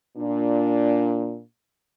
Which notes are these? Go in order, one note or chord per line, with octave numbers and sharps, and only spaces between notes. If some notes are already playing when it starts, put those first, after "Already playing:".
A#2 D4